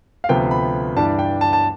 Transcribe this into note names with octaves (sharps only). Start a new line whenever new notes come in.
F5
D2 C3 F3 B3 F4 G5
B5
G2 E3 G3 D4 A5
G5
A5
A5